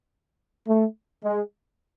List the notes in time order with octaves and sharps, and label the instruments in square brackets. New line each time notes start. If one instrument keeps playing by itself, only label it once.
[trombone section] A3
G#3